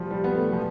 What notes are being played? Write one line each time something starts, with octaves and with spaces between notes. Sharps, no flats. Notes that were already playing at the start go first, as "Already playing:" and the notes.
Already playing: F3 G3
G3
B3
A3
F3